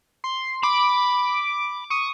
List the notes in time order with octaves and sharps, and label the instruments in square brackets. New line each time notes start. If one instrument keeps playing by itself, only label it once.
[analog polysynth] C6
[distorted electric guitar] B5 [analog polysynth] D6
[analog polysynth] C#6 D#6